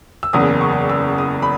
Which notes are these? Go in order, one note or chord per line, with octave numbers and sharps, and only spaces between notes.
E6
F#1 E2 C#3 D#6
C#6
E6
D#6
B5